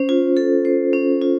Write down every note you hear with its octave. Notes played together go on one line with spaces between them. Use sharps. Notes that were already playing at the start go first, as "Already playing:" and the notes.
Already playing: C#4 C5
F4
A4
C5
C#4
F4